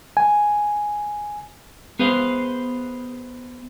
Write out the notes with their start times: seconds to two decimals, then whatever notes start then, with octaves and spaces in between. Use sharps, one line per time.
0.17 G#5
1.99 B3 G#4 B4 C5 F5